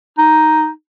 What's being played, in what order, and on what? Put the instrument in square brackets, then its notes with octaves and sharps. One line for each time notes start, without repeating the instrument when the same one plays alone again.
[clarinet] D#4